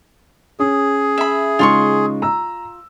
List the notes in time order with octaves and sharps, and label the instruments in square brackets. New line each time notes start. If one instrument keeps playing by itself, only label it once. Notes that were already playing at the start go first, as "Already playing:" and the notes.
[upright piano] C#4 [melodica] G#4
[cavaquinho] E5 B5
[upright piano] C#3 G#3 D#4 [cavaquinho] F4 C6 C#6
[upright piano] A#5 E6